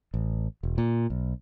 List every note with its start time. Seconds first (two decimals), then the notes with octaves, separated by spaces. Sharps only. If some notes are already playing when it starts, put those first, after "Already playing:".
0.14 A1
0.63 E1
0.78 A#2
1.10 B1